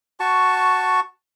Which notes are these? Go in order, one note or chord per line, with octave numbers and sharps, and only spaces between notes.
F#4 A5 C#6